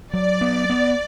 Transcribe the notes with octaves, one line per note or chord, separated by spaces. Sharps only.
F#3 D5
B3
B3